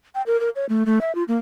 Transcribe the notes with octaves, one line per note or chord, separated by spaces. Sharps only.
G5
A#4
A#4
C#5
A3
A3
E5
F4
A#3